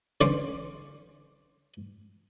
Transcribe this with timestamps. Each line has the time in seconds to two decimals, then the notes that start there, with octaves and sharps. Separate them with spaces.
0.21 D3 E3 C#4 C5 C6 D6